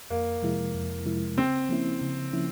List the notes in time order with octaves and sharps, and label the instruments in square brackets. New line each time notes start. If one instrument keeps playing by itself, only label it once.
[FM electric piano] F2 [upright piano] A#3
[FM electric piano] C3 F3 G#3 E4
F2
C3 F3 G#3 E4
[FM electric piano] C#3 [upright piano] C4
[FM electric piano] F3 A#3 C#4 E4
C#3
F3 A#3 C#4 E4